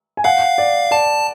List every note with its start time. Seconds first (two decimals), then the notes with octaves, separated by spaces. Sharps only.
0.17 G#5
0.24 F5 F#5
0.58 D5
0.91 D5 A5